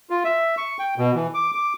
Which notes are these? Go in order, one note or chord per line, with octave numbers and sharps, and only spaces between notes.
F4
E5
C#6
G5
B2
E3
D6
D6